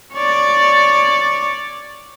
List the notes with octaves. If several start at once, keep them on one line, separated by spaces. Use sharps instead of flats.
C#5 D5